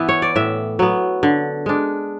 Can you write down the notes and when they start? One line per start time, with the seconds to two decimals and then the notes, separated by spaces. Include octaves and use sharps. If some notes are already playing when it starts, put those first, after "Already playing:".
Already playing: E3 B3 E4 B4
0.09 C#5
0.22 D5
0.36 A2 E5
0.79 F#3 B3
1.23 D3
1.66 G#3 D4